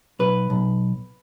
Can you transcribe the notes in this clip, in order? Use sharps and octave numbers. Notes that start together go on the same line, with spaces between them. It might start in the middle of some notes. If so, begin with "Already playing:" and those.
B1 B4
B1